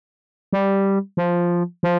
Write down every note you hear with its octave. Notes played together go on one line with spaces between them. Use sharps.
G3
F3
F3